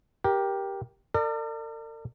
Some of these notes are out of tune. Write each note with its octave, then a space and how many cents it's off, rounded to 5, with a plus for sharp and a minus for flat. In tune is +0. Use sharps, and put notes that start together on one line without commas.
G4 +0 A#4 +20
A#4 -45 D5 +30